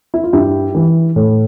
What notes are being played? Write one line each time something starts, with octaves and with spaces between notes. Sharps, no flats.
E4
F4
G2 E4 G4
E3
A2